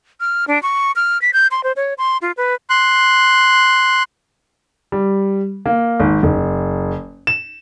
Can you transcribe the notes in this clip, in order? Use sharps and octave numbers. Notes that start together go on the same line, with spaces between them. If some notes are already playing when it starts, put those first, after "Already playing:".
F6
D4
C#6
F6
B6
G6
C6
C5
C#5
C6
F4
B4
C6 F#6
G3
A#3
G#1
F#1
E7